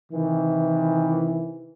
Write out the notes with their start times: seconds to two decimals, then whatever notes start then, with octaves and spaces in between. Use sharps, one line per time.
0.13 C3 D#3 E3